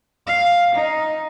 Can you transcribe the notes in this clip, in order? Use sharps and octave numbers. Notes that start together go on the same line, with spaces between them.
F5
D#4